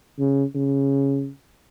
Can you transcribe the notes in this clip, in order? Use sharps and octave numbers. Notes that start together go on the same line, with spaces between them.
C#3
C#3